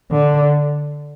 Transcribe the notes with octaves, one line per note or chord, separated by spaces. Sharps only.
D3